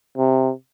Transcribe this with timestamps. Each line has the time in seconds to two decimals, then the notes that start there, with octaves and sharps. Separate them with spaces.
0.17 C3